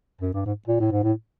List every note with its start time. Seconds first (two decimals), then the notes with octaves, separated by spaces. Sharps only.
0.21 F#2
0.34 G2
0.46 G#2
0.68 A#2
0.80 A2
0.92 G#2
1.04 A2